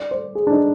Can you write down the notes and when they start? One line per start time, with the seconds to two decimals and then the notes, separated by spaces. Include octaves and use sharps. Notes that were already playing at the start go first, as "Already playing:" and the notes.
Already playing: D5
0.11 C5
0.35 G#4
0.47 D4
0.51 D#4